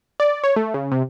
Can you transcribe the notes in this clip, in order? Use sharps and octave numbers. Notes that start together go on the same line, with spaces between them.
D5
C#5
A3
C#3
C3